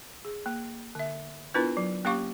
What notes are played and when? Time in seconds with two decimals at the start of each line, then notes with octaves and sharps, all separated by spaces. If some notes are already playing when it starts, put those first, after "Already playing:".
0.25 G#4
0.46 A#3
0.95 D3 E5
1.54 B3 D4 E4 F4 A#4 B4
1.77 F#3
2.05 A#3 C#4 G4 F5 C#6 D6